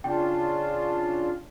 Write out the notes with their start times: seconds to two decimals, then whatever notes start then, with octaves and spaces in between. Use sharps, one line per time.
0.04 C#3 D4 F4 G5